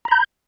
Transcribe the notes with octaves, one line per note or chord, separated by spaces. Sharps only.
A#5 B5 G6